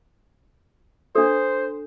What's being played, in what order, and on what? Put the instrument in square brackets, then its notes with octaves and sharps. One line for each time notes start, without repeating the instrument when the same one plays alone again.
[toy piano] D4 A4 [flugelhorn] C5